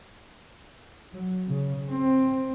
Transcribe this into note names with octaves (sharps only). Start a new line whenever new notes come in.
F#3
C#3
C4